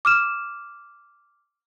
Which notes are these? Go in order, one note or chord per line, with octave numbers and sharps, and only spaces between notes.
D6 F6 E7